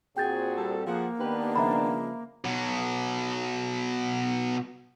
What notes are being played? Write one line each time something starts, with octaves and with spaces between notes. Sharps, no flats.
A#2 C4 F#4 G#4 G5 G6 A6
G3 A4
F3 A#3 G#4 F#5
D#3 B3 D4 G4 B4
C#3 F3 G#3 E5 A#5 B5
B2 F#3